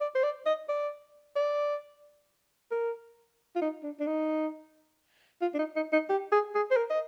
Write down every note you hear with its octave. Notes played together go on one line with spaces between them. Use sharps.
D5
C5
D5
D#5
D5
D5
A#4
F4
D#4
D4
D4
D#4
F4
D4
D#4
D#4
D#4
G4
G#4
G#4
C5
A#4
D#5